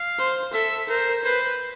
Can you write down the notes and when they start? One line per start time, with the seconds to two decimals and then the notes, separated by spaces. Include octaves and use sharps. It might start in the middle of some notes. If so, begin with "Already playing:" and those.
Already playing: F5
0.19 C5
0.54 A4 E5
0.89 A#4 C5
1.25 B4 C5